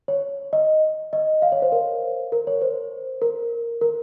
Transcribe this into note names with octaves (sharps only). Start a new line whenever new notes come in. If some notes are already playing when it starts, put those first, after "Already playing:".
C#5
D#5
D#5
F5
C#5
C5
A#4
A#4
C#5
C5
A#4
A#4